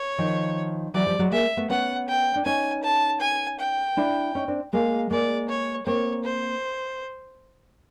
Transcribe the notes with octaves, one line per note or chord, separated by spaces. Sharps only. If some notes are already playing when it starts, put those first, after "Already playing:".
Already playing: C#5
D#3 F3
E3 F#3 D5
F3 G3
F#3 G#3
G#3 A#3 E5
A3 B3
B3 C#4 F#5
G5
D4
C#4 D#4 G#5
A5
G#5
G5
D4 E4
C#4 D#4
C4 D4
G#3 A#3 F5
G#3 A#3 D5
C#5
A#3 C4 C#5
C5